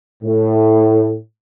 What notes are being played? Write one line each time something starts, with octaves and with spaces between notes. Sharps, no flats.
A2